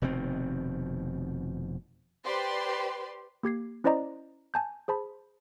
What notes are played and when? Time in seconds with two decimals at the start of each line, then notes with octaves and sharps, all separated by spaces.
0.02 F1 B2 D#3 C4
2.24 G4 B4 C5 D5 C6
3.43 A#3 G4 G#6 C7
3.84 C#4 E4 C5 D5 D#5 A#5
4.54 G#5 A5 G6
4.88 G#4 C5 A5 B5